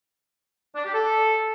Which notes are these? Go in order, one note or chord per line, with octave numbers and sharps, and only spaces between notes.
D4
G4
A4